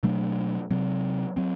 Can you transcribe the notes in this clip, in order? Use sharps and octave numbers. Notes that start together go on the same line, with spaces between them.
B2 F#3 A3 D4
C3 F#3 C4
F#3 C4